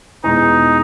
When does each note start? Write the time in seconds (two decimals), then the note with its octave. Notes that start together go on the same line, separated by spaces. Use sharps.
0.23 E2 B2 G#3 D#4